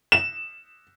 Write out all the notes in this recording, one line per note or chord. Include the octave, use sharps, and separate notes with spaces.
E7